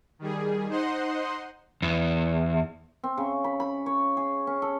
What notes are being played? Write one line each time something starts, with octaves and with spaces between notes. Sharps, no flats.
D#3 G3 G#4
D#4 C5 D#5 F#5 C6
E2
C4
C#3
B5
B5
C#5
G#4
C#4
A4